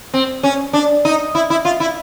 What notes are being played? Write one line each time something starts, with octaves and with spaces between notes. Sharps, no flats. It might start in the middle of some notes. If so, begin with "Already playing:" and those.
C4
C#4
D4
D#4
E4
E4
F4
E4